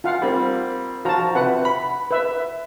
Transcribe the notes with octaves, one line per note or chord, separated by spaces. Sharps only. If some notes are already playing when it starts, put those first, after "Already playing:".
F4 F5 F#5
G3 A#3 C4
F3 F#4 A5 A#5
C3 B4 F#5
B5
B4 E5